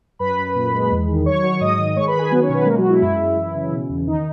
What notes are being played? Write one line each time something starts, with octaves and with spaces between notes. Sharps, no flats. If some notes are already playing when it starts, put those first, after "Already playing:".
F#2 B4 B5
F#2
A#2
G#3
E2
D#3
F#3 C#5 C#6
F#3 C#5 C#6
G#2 D#5 D#6
D#3
G#3 C#5 C#6
B4 B5
D#3
G#4 G#5
F#3 B3 B4
C#4 C#5
B2
B3 B4
G#3 A#3 A#4
F#3 F#4
G#3
E4
F#2 E4
F#2
E3
C#3
B2
E2
D#3 D#4